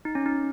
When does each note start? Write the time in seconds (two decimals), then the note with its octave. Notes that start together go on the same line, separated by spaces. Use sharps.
0.05 D#4
0.15 C#4
0.26 D#4